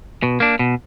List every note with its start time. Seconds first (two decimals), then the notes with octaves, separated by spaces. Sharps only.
0.23 B2
0.40 A#3 D4
0.59 B2